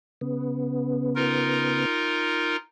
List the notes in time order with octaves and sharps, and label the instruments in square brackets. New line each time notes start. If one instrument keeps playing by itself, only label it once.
[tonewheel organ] C#3 B3
[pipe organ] D#4 F4 A#4